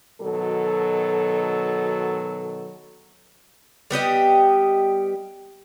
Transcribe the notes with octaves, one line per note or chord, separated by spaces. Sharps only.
B2 D#3 F#3 A4
G3 B3 G4 D#5